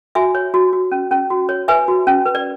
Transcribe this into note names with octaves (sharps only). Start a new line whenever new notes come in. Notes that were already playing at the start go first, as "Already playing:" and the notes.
F#4 E5 G#5
C#5
F#4
F#4
C#4
C#4
F#4
C#5
B4 E5 G#5
F#4
C#4
B4
D5